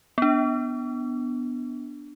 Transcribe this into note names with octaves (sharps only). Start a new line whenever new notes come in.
B3 D4